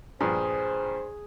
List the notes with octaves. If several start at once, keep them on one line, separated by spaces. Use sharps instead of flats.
G2 A#2 F3 G#4 C5